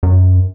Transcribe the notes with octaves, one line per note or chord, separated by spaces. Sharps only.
F#2